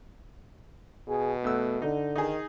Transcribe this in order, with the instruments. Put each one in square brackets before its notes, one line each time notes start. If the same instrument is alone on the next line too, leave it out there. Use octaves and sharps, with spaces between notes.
[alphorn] B2 [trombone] G#4
[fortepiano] E2 E6 [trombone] A3
[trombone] D3 [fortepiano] D#4
[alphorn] D#3 [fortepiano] D#4 G#4